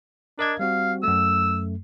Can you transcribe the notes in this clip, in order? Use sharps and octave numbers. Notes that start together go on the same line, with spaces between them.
D4 A#4 D#5 G#6
G3 C4 F#4 F5
F#2 A3 E6